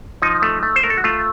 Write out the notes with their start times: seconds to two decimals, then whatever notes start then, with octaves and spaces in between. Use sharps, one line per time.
0.22 F3 D#4
0.42 A3
0.63 A3
0.76 C5
0.83 A3 A#4
0.90 A4
0.97 F#4
1.04 A3 F4